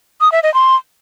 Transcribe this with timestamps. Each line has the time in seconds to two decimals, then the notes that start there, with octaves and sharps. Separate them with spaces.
0.21 D#6
0.32 E5
0.43 D#5
0.54 C6